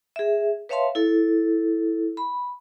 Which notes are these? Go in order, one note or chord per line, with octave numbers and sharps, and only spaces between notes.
G#4 E5
B4 C#5 E5 F5 A5 C6
E4 A4
B5